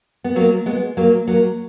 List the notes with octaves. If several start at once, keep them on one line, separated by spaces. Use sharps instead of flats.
B3
F#3 A#3
G#3 B3
F#3 A#3
F#3 A#3